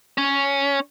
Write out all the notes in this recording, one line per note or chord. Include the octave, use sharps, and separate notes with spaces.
C#4